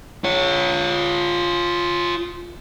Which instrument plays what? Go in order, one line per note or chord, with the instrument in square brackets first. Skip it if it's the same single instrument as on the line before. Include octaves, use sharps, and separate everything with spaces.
[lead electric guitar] F4 C#5